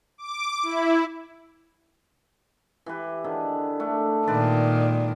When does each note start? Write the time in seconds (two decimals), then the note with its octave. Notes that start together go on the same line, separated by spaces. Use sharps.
0.18 D6
0.63 E4
2.86 E3 G4 B4
3.24 D3 D#3 G#4
3.79 D#3 A3 D4
4.27 A#2 D#3 G#3 B4 D5